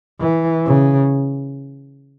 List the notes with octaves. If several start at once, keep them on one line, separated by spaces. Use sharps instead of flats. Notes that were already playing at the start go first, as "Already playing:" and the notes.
E3
C#3